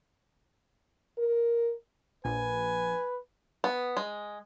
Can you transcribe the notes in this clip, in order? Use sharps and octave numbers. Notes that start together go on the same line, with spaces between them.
A#4
A#1 B4 G#5
B3
G#3